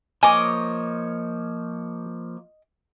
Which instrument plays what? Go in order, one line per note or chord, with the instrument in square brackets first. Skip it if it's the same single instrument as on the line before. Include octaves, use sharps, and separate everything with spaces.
[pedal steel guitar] F3 A#3 C#5 [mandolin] D#5 D6 [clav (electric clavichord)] G#5